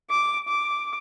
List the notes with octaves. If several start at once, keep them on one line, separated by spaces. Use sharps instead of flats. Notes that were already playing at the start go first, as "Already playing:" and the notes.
D6
D6